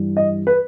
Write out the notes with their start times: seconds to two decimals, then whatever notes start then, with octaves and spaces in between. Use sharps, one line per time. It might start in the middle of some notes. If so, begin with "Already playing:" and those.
Already playing: G2 E3 G3
0.17 D#5
0.47 B4